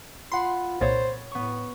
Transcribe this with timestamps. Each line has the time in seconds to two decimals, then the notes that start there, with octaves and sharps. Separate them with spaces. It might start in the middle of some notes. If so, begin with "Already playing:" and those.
0.32 F4 F#5 B5 C6
0.81 C2 A#2 C5 C#5 A6
1.31 A2 B3 C#6